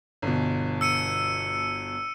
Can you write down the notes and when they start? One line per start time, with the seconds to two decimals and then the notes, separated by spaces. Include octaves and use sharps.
0.22 G1 B2
0.81 E6 C#7 D#7